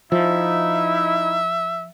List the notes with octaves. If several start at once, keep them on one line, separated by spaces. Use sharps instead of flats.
F3 D#4 E4 E5